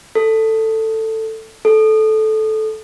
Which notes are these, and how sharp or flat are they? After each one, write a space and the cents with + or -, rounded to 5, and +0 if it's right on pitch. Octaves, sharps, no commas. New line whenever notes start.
A4 +10
A4 -15